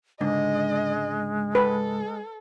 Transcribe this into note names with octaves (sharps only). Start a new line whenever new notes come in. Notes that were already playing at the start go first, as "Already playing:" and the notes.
C#2 G#2 D3 G#3 D#5
A4 B4